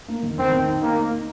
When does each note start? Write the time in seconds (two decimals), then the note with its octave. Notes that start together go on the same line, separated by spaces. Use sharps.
0.08 A#3
0.23 D#3
0.39 D#3 C4
0.52 D#3
0.68 D#4
0.82 A#3 D#4
0.97 A#3
1.11 D#4